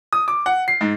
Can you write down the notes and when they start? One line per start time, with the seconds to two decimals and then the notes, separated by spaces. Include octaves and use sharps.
0.13 D#6
0.28 D6
0.46 F#5
0.68 C7
0.81 G#2